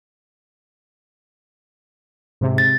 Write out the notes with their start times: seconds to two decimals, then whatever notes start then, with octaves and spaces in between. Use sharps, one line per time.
2.41 G#2 C3
2.58 A6